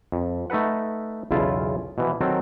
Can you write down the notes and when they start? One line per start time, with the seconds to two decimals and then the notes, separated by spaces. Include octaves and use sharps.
0.12 F2
0.50 A3 D#4 A4 B4 F#5
1.31 B1 E2 C#3 E4 F4 A5
1.98 B2 E3 F3
2.21 D#3 F#3 C4 A4 A#4